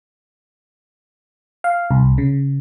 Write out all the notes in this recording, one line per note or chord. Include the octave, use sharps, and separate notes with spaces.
F5
C2
C#3